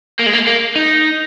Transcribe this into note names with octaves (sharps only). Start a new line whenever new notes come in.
A#3
G#3
A#3
A#3
D#4